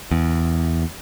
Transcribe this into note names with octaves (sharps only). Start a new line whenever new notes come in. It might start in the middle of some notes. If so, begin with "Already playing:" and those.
E2